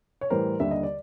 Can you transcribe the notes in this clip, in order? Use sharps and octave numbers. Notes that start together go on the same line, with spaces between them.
C#5
A2 E3 G3 A#4 C5
D#2 D3 G3 E5
D#5
D5